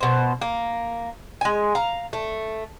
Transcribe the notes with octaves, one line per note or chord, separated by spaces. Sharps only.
B2 C5
A#3
G#3 G#5
F5 A#5
A3